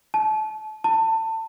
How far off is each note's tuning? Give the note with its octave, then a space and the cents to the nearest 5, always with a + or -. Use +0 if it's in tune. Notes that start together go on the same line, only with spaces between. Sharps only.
A5 -30
A5 +25